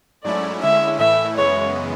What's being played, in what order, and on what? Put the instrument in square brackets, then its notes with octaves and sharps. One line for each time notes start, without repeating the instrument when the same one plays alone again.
[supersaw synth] G#2 F#3 A3 C#4 E4 [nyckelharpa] D5
[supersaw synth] D3 G#3 C#4 E4 [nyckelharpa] E5
[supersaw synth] A2 E3 A3 E4 [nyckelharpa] E5
[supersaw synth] F#2 C#3 E3 G#3 B3 [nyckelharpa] C#5